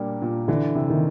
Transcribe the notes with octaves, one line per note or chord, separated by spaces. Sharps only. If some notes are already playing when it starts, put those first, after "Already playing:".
Already playing: A#2 G3 A#3 D4
A#2
D3 E3
C3
D#3